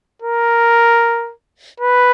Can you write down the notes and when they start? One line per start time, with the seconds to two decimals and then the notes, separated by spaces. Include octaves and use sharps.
0.22 A#4
1.80 B4